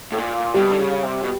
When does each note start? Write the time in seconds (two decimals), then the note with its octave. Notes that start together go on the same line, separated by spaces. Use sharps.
0.12 A2
0.18 A#2
0.54 B2 G3
0.71 D3
0.79 C#3
1.03 C3
1.23 B2